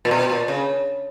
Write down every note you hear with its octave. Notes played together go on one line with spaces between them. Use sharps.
A#2
B2
A#2
C#3